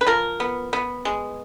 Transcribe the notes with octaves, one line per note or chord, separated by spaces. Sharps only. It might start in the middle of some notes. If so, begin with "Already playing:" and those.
B4
F3 A#4
B3
B3
G#3